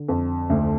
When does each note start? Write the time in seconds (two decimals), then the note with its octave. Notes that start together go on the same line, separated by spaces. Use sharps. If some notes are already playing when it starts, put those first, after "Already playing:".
Already playing: D3
0.08 F2
0.50 D2